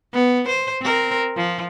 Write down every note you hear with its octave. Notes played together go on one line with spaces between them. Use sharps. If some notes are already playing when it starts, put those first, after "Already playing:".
B3
C5
C4 A#4
F3